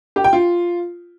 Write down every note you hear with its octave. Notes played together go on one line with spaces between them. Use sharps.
G4
G5
F4